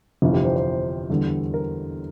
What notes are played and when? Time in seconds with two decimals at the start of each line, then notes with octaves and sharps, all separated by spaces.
0.22 G1 F2 C3 E3 F4
0.33 G4
0.45 C5
0.56 C5
1.10 E2 D3 G3
1.54 A#4